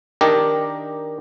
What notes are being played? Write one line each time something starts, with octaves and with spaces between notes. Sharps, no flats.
D#3 D4 G4 A#4 D#5